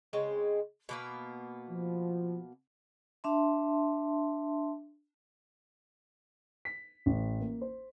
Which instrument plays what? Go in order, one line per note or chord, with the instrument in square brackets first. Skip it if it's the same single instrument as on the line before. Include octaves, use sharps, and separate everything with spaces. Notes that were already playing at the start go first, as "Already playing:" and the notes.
[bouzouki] C#3 G#3 C4
B2 A#3 B3
[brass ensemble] F3
[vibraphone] D4 E5 A5 C6
[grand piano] B6
A1
A#3
C5